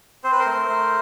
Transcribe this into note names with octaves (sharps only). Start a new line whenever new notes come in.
C4 C5
B4
A#4 C5
A3
A3